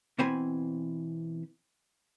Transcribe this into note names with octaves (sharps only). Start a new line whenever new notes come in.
B2 E3 C4 C5 G#5 B5